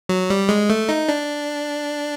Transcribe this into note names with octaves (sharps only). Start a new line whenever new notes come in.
F#3
G3
G#3
A3
D#4
D4